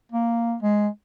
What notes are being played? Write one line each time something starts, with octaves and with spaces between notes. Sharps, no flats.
A#3
G#3